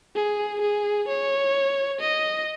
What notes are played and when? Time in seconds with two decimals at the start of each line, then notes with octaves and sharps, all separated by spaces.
0.15 G#4
0.61 G#4
1.08 C#5
2.01 D#5